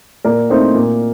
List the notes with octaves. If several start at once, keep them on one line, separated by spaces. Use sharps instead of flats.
A#2 A#4 D5
A3 C4 D#4
A#2